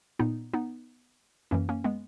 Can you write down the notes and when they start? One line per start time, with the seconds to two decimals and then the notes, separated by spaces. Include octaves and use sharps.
0.19 A#2 B3 D#4
0.53 B3 D#4
1.51 F#2 E3 A#3 C#4
1.69 A#3 C#4
1.84 G#3 B3